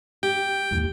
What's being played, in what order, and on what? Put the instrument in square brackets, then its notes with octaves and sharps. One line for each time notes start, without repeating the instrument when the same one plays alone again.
[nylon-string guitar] G4 [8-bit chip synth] G5
[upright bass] D#2 E3